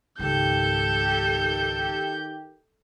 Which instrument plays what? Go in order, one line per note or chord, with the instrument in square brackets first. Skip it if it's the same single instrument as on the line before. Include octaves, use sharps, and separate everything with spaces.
[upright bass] C#2 G#2 [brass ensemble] D#3 G4 [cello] A4 [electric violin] G6